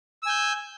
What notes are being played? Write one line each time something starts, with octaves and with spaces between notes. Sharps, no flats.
G#5 E6 G6